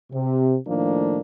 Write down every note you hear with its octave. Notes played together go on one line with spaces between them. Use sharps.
C3
A2 D#3 F3 A3 A#3 D4